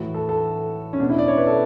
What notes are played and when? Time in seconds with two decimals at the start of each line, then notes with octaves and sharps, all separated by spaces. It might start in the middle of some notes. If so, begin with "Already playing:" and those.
Already playing: A2 E3 F#4
0.14 A4
0.29 A4
0.93 C#4
1.00 B2 D4
1.10 E4
1.18 D5
1.28 C#5
1.38 B4
1.47 A4